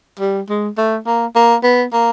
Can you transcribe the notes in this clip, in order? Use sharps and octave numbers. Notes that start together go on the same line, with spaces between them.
G3
G#3
A3
A#3
A#3
B3
A#3